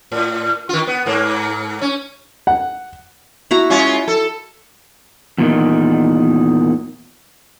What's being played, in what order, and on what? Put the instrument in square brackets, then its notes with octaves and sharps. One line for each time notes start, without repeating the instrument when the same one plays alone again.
[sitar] A2
D#3 F4
B3
G#2 A#3
C#4
[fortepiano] F#5
[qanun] E4 F#4 A#5
[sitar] G#3 C#4 F4
A4
[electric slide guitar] E2 A#2 D#3